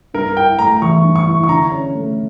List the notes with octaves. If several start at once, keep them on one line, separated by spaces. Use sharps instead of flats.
G2 A#4
E4 G5
A3 A#5
E3 C#6
G2
C#6
E4
C#6
D3 A#5
C#4
A3